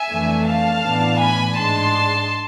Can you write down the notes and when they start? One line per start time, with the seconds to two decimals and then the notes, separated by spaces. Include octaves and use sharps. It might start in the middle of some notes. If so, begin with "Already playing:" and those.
Already playing: E5 G#5
0.10 F2 E3 A3 D4
0.46 F5 A5
0.84 A2 E3 B3 D4
1.20 G#5 B5
1.57 G#2 G#3 D4 A5 C6